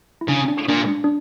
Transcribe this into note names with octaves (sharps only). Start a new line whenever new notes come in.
E4
C#3 D4
D4
A#2 D4
D4
D4